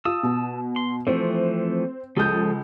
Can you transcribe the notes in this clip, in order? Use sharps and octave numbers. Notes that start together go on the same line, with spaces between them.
F4 A5 D#6 E6
B2
C6
E3 F3 A3 C4
C#2 F3 A4 D#6 G6